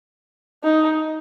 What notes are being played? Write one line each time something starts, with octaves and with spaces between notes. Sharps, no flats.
D#4